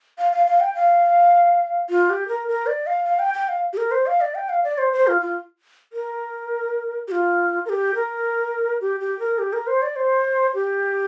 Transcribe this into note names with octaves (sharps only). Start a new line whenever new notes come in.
F5
F5
F5
G5
F5
F4
G4
A#4
A#4
D5
F5
F5
G5
G5
F5
G4
A#4
C5
F5
D5
G5
F5
D5
C5
C5
F4
F4
A#4
G4
F4
A#4
G4
A#4
G4
G4
A#4
G4
A#4
C5
D5
C5
G4